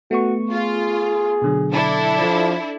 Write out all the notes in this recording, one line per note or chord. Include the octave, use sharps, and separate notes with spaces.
A3 B3 F#4 C#6
F4 G#4
B2 D3 F#3
D4 E4 A4
F3